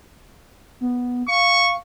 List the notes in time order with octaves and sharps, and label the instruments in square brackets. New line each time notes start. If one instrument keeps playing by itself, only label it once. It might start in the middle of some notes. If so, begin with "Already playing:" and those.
[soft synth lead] B3
[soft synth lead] F5 [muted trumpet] C#6